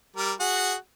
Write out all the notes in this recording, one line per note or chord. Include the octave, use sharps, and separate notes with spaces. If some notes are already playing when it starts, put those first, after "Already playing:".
G3 A#4
F#4 G#4 F#5